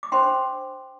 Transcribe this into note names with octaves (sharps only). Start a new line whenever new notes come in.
D6
D4 C5 G5 C6